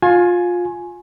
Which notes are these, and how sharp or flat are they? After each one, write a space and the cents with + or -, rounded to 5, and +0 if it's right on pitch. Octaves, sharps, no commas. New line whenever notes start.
F4 +20 G#5 +10 C6 +45